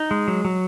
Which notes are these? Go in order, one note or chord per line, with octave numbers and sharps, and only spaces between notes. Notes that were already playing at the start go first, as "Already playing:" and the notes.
Already playing: D#4
G#3
F#3
F#3